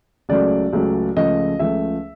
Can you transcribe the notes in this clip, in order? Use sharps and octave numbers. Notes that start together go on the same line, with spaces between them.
C#2 C#3 F#3 A3 D5
C#2 C#3 F#3 A3
C#2 C#3 F3 A3 D#5
C#2 C#3 F3 A3 E5